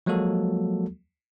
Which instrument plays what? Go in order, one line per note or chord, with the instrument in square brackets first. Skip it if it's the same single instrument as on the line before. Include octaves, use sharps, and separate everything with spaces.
[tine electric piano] F3 F#3 G#3 A#3 F#4 A4